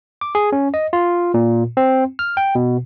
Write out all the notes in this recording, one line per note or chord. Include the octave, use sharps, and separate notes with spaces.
D6
G#4
C#4
D#5
F4
A#2
C4
F6
G5
B2